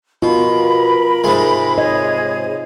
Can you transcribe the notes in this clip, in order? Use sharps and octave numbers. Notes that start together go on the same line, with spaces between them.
B2 F4 A#4 B5
G#2 C3 G#3
G#4 C#5 D#5